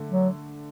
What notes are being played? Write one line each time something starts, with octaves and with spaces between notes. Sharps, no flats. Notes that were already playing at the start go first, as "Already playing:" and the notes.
Already playing: D3 A3
F#3